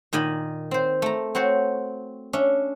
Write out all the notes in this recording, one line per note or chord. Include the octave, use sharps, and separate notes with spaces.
A#2 D#3 D#5 G#5 B5
C4 C5
A3 A#5
C4 F#4 C5 C#5
C#4 D4 E5